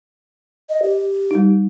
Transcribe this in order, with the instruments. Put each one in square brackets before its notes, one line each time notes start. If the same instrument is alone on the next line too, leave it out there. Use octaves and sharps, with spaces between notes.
[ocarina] D#5
G4
[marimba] G3 D#4